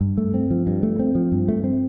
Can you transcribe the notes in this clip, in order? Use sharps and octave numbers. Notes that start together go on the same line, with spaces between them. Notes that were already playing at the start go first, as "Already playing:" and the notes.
G2
A3
C4
F3
G2
A3
C4
F3
G2
A3
C4